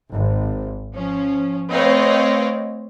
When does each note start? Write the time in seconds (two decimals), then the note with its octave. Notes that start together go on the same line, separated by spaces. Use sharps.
0.13 G#1
0.93 F3 C#4
1.71 A3 C4 B4 C#5 D#5 F5